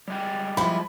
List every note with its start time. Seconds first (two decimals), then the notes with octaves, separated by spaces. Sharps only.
0.08 G3 G#3 G5
0.57 F3 E4 B5